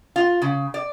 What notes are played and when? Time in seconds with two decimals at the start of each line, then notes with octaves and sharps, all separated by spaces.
0.16 F4
0.42 C#3
0.74 D5